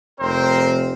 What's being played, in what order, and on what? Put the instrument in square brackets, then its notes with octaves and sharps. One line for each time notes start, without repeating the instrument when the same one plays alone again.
[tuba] F1 [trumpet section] C4 A#4 C5